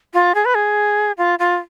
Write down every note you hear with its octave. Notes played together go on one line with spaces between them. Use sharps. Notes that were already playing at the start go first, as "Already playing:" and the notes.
F4
G#4
B4
G#4
F4
F4